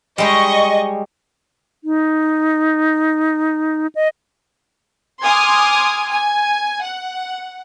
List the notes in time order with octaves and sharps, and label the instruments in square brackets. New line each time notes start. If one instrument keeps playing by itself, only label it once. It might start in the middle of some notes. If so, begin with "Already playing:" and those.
[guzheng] G3 G#3 G4 [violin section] D#5 C#6
[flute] D#4
D#5
[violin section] G#5 C6 D6 D#6 F6 G#6
G#5
F#5